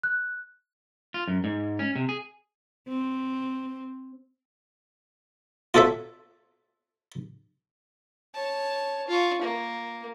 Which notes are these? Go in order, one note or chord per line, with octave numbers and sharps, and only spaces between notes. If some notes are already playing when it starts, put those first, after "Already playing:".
F#6
F4
F#2
G#2
C#4
C3
G#4
C4
F4 F#4 A4 C#5 E5
C#5 A5
F4 C#6
A#3